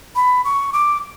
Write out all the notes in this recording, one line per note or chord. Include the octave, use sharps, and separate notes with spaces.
B5
C#6
D6